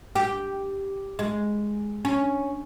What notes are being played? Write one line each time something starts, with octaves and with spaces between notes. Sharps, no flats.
G4
G#3
C#4